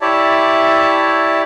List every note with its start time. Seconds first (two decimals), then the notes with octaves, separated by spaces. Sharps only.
0.01 E4 G4 C#5 D5 E5 A5